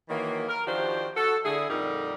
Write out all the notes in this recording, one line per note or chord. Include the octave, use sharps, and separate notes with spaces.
D#3 E3 F#3 A#3
A#4
D#3 F3 D4 F#4 G4 C5
F#4 A4
D3 E4 G#4
F2 A#2 D3 G3 D#4 A#4